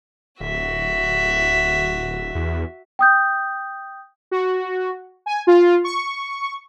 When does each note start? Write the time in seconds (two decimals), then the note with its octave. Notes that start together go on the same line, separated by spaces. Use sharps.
0.40 D1 F#4 E5
2.35 E2
2.99 G5 D#6 G6
4.31 F#4
5.26 G#5
5.47 F4
5.84 C#6